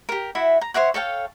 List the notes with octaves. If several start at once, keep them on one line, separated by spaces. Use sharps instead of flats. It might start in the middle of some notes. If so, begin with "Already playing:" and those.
G4 A#4
E4 F#4 E5
A#5
C5 C#5 E5 F#5
A4 C#5 F5 G5